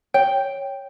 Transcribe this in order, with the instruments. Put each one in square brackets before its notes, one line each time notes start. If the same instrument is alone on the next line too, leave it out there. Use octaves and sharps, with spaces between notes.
[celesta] C#5 [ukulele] G5